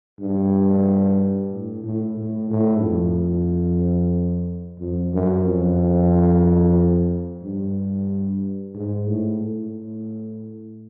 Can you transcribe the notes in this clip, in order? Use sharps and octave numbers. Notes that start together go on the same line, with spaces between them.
G2
A2
A2
A2
A2
F2
F2
F#2
F2
G2
G#2
A2
A2